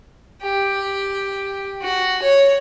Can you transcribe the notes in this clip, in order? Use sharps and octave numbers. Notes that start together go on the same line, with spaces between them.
G4
F#4
C#5